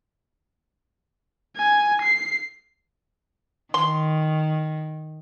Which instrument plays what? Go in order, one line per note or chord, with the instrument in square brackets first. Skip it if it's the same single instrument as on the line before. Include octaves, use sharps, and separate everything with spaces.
[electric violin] G#5
C7
[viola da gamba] D#3 [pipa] C6